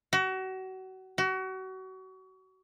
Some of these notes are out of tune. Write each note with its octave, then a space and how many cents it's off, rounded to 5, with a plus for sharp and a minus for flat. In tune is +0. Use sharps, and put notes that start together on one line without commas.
F#4 +30
F#4 +30